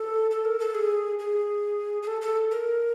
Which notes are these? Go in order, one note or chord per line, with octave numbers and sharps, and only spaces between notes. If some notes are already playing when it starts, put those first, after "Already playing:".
Already playing: A4
A4
A#4
A4
G#4
G#4
G#4
A4
A4
A#4